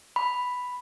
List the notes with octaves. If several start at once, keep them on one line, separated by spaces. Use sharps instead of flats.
B5